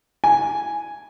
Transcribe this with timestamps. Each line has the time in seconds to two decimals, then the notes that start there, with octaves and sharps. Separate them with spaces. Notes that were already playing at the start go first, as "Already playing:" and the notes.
0.24 G#5